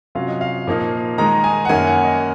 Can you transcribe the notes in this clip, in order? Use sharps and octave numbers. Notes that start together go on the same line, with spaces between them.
C3 F#3 C#4 F4 F5
D#5
F5
A#2 F3 A#3 D#4
D#3 G#3 D#4 A#5
G#5
F#5
F#2 D#3 A#3 C#4 G#5
F#5
D#5